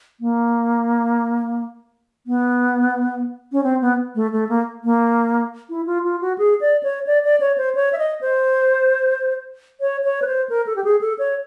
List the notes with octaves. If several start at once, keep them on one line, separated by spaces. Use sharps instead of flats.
A#3
B3
C#4
C4
B3
A3
A3
A#3
A#3
E4
F4
F4
F#4
G#4
D5
C#5
D5
D5
C#5
C5
C#5
E5
D#5
C5
C#5
C#5
B4
C5
A#4
A4
G4
G#4
A4
C#5